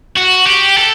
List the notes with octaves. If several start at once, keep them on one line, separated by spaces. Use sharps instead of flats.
F#4
G4
A4